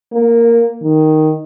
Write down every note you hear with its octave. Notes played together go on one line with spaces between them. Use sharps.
A#3
D#3